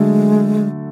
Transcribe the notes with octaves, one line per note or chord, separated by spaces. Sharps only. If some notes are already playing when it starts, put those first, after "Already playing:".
Already playing: D3 F#3 G#3 A3